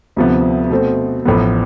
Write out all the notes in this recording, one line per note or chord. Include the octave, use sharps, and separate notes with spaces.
D2 C3 F3 B3
B2 A3 C4
A1 A2 F3 B3